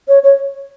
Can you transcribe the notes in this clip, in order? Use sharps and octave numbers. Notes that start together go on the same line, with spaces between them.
C#5
C#5